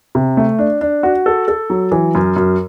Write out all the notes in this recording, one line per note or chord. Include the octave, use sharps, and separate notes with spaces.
C3
A3
D4
D4
F#4
A4
A4
F#3
E3
F#2
F#2